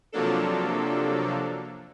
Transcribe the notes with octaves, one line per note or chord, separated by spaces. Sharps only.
C3 F3 F#3 A#3 D4 A4